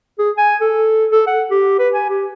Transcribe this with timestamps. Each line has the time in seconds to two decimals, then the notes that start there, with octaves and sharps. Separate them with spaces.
0.19 G#4
0.38 G#5
0.61 A4
1.11 A4
1.27 F#5
1.51 G4
1.79 B4
1.94 G#5
2.09 G4